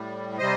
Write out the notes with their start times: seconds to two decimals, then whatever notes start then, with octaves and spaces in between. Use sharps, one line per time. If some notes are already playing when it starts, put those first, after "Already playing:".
Already playing: A2 G3
0.38 C3 G3 C5 D#5